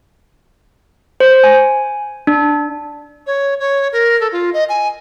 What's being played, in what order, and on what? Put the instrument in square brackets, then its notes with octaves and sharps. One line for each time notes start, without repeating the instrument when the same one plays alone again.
[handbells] C5
G#5
D4
[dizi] C#5
C#5
A#4
A4
F4
D#5
G#5